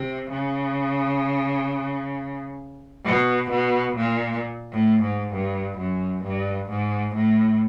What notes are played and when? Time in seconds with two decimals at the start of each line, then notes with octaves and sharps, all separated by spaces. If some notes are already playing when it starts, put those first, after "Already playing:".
Already playing: C3
0.32 C#3
3.05 B2
3.51 B2
3.96 A#2
4.73 A2
5.02 G#2
5.33 G2
5.78 F#2
6.24 G2
6.69 G#2
7.15 A2